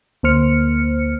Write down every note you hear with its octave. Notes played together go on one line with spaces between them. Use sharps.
D2 A#3 C5 F6 C#7